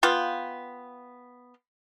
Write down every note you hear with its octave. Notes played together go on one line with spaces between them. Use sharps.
B3 F4 F5 G5